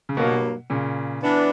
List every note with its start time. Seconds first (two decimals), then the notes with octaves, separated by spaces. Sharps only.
0.09 C#3
0.17 G2 B2 F#3 A#3
0.70 A#2 C#3
1.23 E3 B3 D4